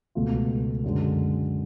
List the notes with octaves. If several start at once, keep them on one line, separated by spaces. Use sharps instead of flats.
C#2 B2 A3 F4
F#2 D3 G#3